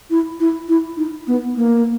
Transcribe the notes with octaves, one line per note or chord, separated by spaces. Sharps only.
E4
E4
E4
D#4
B3
A#3